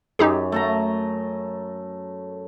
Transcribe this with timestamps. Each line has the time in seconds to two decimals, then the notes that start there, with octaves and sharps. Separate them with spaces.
0.19 F#2 D#4 G4 G#4
0.52 A3 A5 A#5